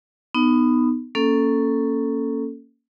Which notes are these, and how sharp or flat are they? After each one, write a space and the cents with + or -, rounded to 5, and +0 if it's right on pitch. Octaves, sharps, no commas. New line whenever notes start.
B3 +15 D#4 -10
A#3 +0 C#4 +0 A4 +0